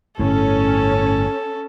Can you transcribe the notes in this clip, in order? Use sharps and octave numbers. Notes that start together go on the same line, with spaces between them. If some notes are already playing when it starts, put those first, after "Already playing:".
G1 A2 C#4 A4